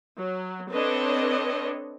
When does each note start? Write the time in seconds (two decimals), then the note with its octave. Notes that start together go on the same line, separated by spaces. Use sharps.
0.18 F#3
0.72 C4 D4 A4 B4 C#5 D#5